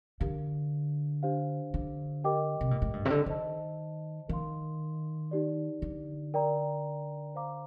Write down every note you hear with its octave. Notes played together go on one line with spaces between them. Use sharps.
D3 G4 A#4 F5
D4 G4 C5 F5
D3
G4 A#4 D#5 G5 D6
C3
A#2
A2
G2
C3
D3
D#3 C5 D#5 A5
D#3 A#4 F5 C6
D#4 G4 D5
D3
A#4 D5 G5 A#5
C5 F5 A#5 D6